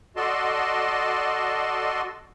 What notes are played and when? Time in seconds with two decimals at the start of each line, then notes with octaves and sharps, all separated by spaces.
0.16 F#4 A4 D5 D#5 A5 C6